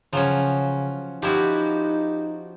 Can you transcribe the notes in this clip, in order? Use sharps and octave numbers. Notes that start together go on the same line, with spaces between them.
C#3 F3 F#3 C#4
F3 D#4 E4 F#4 G4